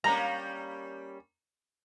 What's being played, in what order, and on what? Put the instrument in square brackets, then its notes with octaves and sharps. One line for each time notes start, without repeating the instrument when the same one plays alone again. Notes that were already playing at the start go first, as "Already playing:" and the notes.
[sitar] G3 A#3 C#4 [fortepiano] A#5